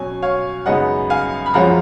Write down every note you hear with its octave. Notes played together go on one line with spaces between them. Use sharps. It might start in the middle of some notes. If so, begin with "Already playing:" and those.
Already playing: B2 F#3 C#4 G#5
C#5 F5
F#2 C#3 G#3 B3 D#4 D#5 F#5
F5 G#5
B5
F#2 F3 G#3 C#4 F4 F#5 A#5